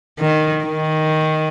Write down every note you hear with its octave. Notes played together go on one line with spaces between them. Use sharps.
D#3
D#3